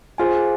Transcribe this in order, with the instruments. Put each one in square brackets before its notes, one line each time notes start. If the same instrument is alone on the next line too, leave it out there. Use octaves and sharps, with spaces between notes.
[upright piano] F4 [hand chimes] G#4 C5 F5 G#5